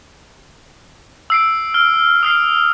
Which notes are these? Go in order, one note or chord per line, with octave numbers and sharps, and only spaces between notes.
E6 C7 D7
F6
D#6 F6 C7